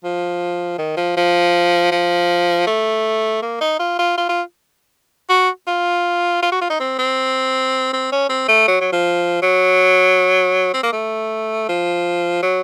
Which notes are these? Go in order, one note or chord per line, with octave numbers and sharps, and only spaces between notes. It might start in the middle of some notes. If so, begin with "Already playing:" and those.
F3
D#3
F3
F3
F3
A3
A#3
D#4
F4
F4
F4
F4
F#4
F4
F4
F#4
F4
D#4
C4
C4
C4
C#4
C4
A3
F#3
F#3
F3
F#3
C4
A#3
A3
F3
F#3